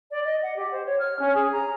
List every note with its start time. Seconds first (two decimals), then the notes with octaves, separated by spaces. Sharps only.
0.11 D5
0.24 D#5
0.42 F#5
0.56 G4
0.71 C5
0.86 C#5
0.99 F6
1.19 C#4
1.34 G#4
1.52 A#5